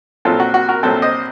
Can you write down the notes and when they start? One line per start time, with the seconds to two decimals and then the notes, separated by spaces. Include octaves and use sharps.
0.25 A#1 A#2 F#3 C4 F4 A4
0.40 F#4
0.54 F#4
0.69 F#4 A#4
0.83 A#1 A#2 F#3 C4 A4 C5
1.02 C5 D#5